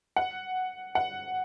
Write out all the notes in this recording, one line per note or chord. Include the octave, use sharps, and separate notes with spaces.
F#5
F#5